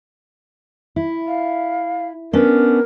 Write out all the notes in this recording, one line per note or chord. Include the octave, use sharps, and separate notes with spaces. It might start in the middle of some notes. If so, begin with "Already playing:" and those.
E4
F5
B3 C#4 D4 A#4